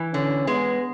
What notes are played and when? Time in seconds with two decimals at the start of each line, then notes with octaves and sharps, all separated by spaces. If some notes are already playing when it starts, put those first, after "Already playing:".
Already playing: E3
0.14 D3 C#4
0.47 G#3 B3